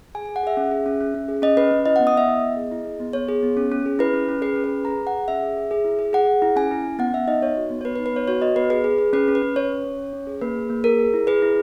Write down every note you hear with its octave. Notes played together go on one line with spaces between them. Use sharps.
G#4 G#5
G#4 G#5
F#5
G#4 E5
C#4
G#4
C#4
C#4
C#4
G#4
C#4 D#5
C#4 B4
C#4
E4 D#5
B3 F#5
D#6
B3 E5
E4 D#5
B3
G#4
E4
G#4
B3
B3 C#5
G#4
B3
C#4
C#4
G#4
E4 B4
C#4
C#4
G#4 B4
C#4
B4
G#4
G#4 A#5
G#4
F#5
G#4
C#4 E5
G#4
G#4
G#4
E4
G#4
G#4 F#5
G#4
E4
C#4 G#5
E4
C#4
B3 F#5
B3 E5
D#4 D#5
D#4 C#5
F#4
B3
C#5
B3 B4
B4
D#4
B4
B3 C#5
F#4 C#5
F#4 D#5
B3 B4
G#4 B4
G#4
G#4
C#4 B4
C#4
B4
C#4
C#4 C#5
C#4
C#4
C#4
C#4
G#4
A#3 B4
G#4
A#3
G#4 A#4
G#4
E4
G#4 B4
E4